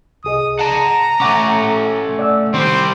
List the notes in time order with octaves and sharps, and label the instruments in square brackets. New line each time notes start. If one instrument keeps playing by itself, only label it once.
[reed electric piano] C2 G#4 D#5 [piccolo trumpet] D#6
[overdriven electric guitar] F#5 A5 [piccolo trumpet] A#5
[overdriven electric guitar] A3 C#4 [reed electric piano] F#5 C#6 D6
[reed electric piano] D5 F#5 E6
[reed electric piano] D#3 [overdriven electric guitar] G3 C4 [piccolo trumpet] C5